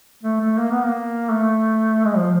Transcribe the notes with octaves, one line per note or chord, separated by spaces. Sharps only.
A3
A3
A#3
B3
A#3
A3
G#3
F3